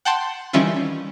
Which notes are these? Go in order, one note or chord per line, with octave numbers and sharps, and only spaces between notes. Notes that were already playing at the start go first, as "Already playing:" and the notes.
F#5 G5 A5 C6
D#3 E3 G3 C#4 E4 F4